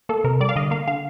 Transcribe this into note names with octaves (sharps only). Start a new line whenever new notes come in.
A#3 A4
C3 A#4
G3 D5
F5
D3 D#5
A#3 F5
D3 F5